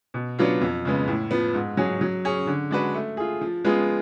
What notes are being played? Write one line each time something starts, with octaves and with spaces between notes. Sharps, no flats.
B2
F#3 B3 D4 F4
F2
C#3 G#3 B3
A2
F3 B3
G#2
F#3 C#4 G#4
F#3
C#4 G#4
D3
G#3 D4 F#4 B4
A3
F4 G#4
F3
G#3 B3 F4 G#4